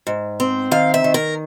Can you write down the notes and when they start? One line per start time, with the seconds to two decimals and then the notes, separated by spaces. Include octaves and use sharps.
0.07 G#2
0.40 C4
0.71 D#3 F5
0.94 E5
1.04 D#3
1.14 A#4